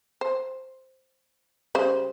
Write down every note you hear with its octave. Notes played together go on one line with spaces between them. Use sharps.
C5
C#3 G3 C5